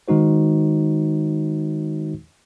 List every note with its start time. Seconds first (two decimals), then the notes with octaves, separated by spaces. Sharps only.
0.08 D#3 G#3 D#4 F#4 C5